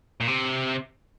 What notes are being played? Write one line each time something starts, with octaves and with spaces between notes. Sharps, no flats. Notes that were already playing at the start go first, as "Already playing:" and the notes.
A#2
C3